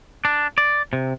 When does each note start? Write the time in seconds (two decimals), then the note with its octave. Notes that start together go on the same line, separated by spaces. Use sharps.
0.25 D4
0.58 D5
0.93 C3